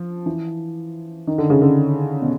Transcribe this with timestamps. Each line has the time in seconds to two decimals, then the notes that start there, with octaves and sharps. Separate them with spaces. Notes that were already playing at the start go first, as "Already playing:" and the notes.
Already playing: F3
0.26 E3
1.27 D#3
1.38 D3
1.50 C#3
1.62 D3
2.22 B2